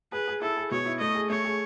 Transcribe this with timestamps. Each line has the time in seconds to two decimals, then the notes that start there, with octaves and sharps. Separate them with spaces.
0.12 G#4 B4
0.28 G#4
0.42 E4 A4
0.57 G#4
0.71 B2 C#5
0.86 E4
1.00 A3 D#5
1.15 G#4
1.30 A3 C#5
1.44 G#4